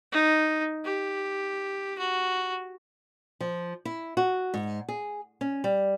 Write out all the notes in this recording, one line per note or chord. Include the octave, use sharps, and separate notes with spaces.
D#4
G4
F#4
F3
E4
F#4
G#2
G#4
C#4
G3